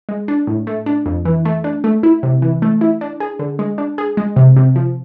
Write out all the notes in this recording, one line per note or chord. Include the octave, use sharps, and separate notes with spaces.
G#3
D4
A2
A3
D4
F2
E3
A3
D4
A3
E4
C3
E3
A3
E4
D4
G#4
D3
G#3
D4
G#4
G#3
C3
C3
F3